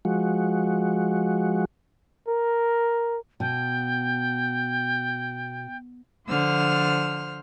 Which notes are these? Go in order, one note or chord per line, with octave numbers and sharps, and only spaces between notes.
F3 G#3 F#4
A#4
B2 G5
D3 F3 C5 E6 F6